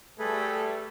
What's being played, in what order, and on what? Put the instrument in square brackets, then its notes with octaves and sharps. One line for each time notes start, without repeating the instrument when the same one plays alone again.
[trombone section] G3 A3 [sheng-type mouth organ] G#4 A4 B4